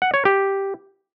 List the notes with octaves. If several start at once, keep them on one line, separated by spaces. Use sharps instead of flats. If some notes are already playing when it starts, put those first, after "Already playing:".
F#5
C#5
G4